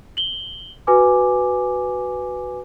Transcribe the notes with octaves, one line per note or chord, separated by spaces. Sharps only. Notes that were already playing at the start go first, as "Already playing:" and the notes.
F#7 G7
F#4 B4 G#5 D6